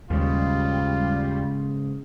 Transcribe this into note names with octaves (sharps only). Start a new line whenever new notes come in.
D#2 G#2 C#3 G3 F4